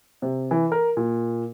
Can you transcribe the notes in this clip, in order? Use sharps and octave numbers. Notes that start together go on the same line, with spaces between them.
C3
E3
A#4
A#2